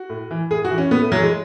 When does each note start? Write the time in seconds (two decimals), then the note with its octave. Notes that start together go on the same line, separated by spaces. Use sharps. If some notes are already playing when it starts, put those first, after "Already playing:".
Already playing: F#4
0.10 A2
0.31 E3
0.51 A2 G#4
0.65 F#4
0.71 E3
0.78 C#4
0.91 A2 B3
1.02 A3
1.12 E3 F#3
1.22 G#3